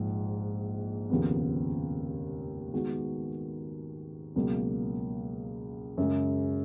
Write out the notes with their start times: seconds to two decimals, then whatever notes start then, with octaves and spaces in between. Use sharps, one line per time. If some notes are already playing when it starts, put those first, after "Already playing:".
Already playing: A#1 G#2 F3 G#3
1.10 F1 D#2 C#3 F3 B3
2.73 D#3 G#3 B3 F#4
4.36 C#2 B2 F#3 A#3
5.97 F#2 C#3 G#3